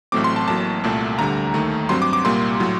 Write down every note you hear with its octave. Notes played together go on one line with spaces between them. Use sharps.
A1 A2 F#3 A3 C4 D6
C6
A5
A1 A2 F#3 A#3 A5
C2 A#2 A3
D2 D3 G3 A#5
D#2 D#3 A3
G2 F#3 C4 C6
D6
D6
C2 A#2 G3 A#3 C6
A2 F#3